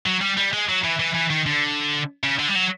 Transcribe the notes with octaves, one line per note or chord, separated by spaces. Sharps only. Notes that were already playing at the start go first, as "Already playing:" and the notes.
F#3
G3
G3
G#3
F#3
E3
E3
E3
D#3
D3
C#3
D3
G3
F#3